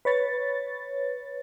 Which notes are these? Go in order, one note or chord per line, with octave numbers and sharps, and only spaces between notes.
B4 C#5 A6